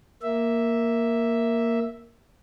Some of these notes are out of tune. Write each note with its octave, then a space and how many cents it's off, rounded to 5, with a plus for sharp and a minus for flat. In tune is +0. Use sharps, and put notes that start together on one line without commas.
A#3 +0 E5 +0